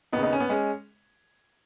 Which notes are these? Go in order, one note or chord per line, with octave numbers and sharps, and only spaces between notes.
D#2 C#3 B3 D#4
B3 D#4
C#4
B3
G#3 C#4